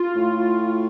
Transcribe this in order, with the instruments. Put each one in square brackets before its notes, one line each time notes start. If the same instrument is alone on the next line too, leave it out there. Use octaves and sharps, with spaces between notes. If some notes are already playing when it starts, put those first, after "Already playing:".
Already playing: [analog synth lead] F4
[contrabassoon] A2